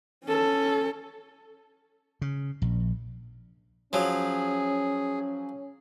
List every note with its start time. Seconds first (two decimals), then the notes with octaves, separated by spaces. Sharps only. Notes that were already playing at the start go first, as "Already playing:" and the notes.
0.24 C#4 A4
2.22 C#3
2.62 A#1
3.93 F3 F#3 C#4 G#4